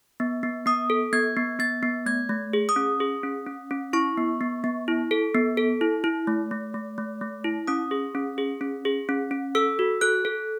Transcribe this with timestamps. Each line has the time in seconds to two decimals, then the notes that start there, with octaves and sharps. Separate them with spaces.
0.20 B3
0.43 B3
0.66 B3 D#6
0.90 A4
1.13 B3 G#6
1.37 B3
1.59 B3 A6
1.83 B3
2.06 A3 G#6
2.29 A3
2.53 G#4
2.69 D#6
2.76 C#4
3.00 G#4
3.23 C#4
3.47 C#4
3.71 C#4
3.93 E4 C#6
4.18 B3
4.41 B3
4.64 B3
4.88 E4
5.11 A4
5.35 B3
5.57 A4
5.81 E4
6.04 E4
6.27 A3
6.51 A3
6.74 A3
6.98 A3
7.21 A3
7.44 E4
7.67 C#4 D#6
7.91 G#4
8.15 C#4
8.38 G#4
8.61 C#4
8.85 G#4
9.09 C#4
9.31 C#4
9.55 A4 E6
9.79 F#4
10.01 A4 F#6
10.25 A4